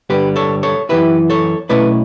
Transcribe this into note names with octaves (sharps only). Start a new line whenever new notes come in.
G2 D3 G3 B3 G4 B4
A4 C#5
A4 C#5
F#2 E3 B3 E4 G4 B4
A4 C#5
B1 B2 A3 C#4 E4 B4 D5